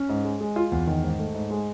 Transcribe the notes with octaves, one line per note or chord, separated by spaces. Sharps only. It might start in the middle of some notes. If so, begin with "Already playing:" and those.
Already playing: C#4
G#2
G#3
G#3
F4
E2
D#3
G#2
A3
G#2
G#3